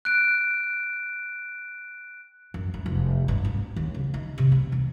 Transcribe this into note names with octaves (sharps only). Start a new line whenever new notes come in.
F#6 D7
F#2
F#2
F1
G2
C4
D#2
C#3
D#4
C3
C4
E2